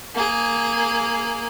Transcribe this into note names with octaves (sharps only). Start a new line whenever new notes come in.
A#3 G#4